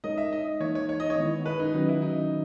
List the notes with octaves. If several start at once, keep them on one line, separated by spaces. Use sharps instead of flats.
G#3 D#4 A#4 C#5 D#5
E5
D#5
E3 A#3 D#4 C#5
C#5
C#5
D#5
C#5
D#3 G#3 B3 E4
B4
D#4
D#3 F#3 C#4 D#4 F#4 B4
E4
D#4